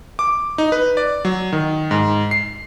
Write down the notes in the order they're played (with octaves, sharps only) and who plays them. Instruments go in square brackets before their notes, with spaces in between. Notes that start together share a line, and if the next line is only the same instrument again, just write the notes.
[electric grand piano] D6
D#4
B4
D5
F#3
D#3
G#2
C7